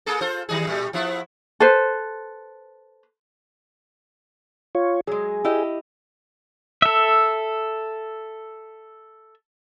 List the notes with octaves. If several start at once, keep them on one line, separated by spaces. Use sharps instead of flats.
A#3 G#4 A4
F4 A4 C5
D#3 G3 G#4
A#2 G3 A3
F3 B3 E4
A4 B4 C5
F4 C#5
F#3 G#3 G#4
E4 G4 D#5
A4 E5